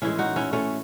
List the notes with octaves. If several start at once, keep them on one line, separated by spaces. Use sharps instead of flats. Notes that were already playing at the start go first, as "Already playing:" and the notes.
A2 E3 G#3 C#4 E4
D#4 F#4
C#4 E4
A3 C#4